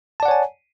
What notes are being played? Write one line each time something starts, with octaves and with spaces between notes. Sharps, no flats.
C#5 D5 F#5 G#5 A5